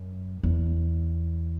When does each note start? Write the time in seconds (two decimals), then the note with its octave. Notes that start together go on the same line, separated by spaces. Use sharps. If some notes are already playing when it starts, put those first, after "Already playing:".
Already playing: F#2
0.43 E2